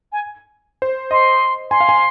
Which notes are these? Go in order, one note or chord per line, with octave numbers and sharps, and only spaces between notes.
G#5
C5
D#5 C6
G#5 C6
F5
G#5